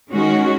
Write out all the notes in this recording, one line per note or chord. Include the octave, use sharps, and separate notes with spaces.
D#3 G#3 C#4 F#4